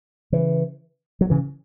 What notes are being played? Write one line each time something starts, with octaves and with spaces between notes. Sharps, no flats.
C#3 E3
F#3
C#3 E3